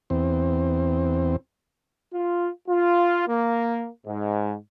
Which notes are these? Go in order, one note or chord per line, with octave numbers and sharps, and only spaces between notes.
E2 C4
F4
F4
A#3
G#2